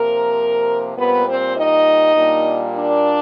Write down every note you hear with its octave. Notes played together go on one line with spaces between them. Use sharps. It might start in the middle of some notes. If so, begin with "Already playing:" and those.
Already playing: C3 F3 A#3 A#4
A#2 G3 B3 C4 B4
C4 C5
D#4 D#5
A#2 G3 A#3 D4
D4 D5